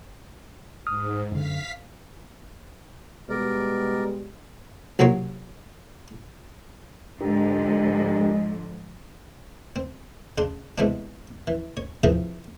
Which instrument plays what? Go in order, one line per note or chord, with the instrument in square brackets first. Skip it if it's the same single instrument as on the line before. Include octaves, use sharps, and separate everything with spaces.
[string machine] G#2 [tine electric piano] D#6 F6
[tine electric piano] F#2 D3 [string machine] F5 B6
[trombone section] B2 G3 G#3 [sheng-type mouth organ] A#4 D5
[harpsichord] C2 A#2 F#3 A#3 C#5
[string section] G#2 D3 F3 [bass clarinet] G#3 [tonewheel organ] D4 G4 A#4
[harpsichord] C4
C#3 D4 C6
G#2 C3 E3 B3 C4 D4
E3
C#5
C3 E3 F3 G#4 A#4 E5